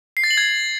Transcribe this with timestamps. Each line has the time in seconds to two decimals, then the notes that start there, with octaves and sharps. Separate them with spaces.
0.17 C7
0.24 A6
0.31 F#7
0.37 G#6